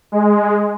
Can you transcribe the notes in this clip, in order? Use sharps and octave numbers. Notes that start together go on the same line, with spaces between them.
G#3